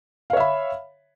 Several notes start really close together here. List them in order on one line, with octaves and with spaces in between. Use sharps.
F5 C#5 E5 B5